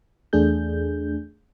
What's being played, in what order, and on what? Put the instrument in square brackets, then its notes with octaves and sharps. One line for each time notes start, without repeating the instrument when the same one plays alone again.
[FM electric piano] E2 A3 D4 G#4 G6